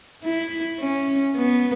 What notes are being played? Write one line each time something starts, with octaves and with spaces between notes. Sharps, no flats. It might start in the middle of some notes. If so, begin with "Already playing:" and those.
E4
C#4
B3